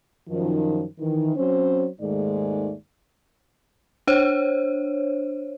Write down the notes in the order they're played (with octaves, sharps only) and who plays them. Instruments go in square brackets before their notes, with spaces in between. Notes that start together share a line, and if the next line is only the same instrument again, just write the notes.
[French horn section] F#2 D#3 F3
D#3 E3
F#3 C4 C#4 C5
D#2 G#2 D#3 G#3 A3 D5
[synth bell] D4 C5 C#5